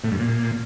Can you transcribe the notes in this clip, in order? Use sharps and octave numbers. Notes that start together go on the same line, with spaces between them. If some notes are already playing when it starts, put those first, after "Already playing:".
A2
G2
A#2